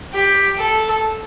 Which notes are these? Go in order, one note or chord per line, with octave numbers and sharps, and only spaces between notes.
G4
A4